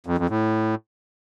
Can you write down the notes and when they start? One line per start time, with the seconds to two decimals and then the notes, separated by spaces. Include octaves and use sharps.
0.07 F2
0.18 F2
0.30 A2